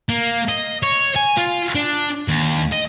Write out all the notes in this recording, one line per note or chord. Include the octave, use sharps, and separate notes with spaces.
A#3
D#5
C#5
G#5
F4
D4
D#2
D#5